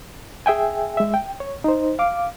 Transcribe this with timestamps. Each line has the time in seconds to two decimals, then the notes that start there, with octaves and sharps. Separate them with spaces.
0.46 G#4 E5 G5 G#5
0.97 G#3 E5
1.14 G5
1.40 C#5
1.64 D#4 C5
1.99 F5 D6